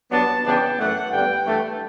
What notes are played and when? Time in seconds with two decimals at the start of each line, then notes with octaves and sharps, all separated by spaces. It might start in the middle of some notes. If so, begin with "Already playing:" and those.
0.11 G2 F#3 B3 D4 A5
0.45 C#3 E3 B3 D4 G5
0.79 F#2 E3 A3 F#5
1.12 G2 D3 G3 B3 G5
1.46 G2 E3 A3